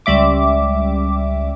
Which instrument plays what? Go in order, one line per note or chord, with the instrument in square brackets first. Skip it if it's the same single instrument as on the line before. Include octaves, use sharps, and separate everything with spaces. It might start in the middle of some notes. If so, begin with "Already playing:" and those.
[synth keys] C#2 G3 E5 D6